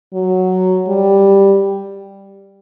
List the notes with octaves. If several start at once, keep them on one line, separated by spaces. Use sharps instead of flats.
F#3
G3